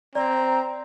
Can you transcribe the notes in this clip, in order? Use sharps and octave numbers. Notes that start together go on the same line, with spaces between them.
C4 D5 A#5